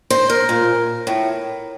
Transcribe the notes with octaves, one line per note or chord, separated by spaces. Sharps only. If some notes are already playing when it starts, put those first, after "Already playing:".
C5
A#4
A#2
A2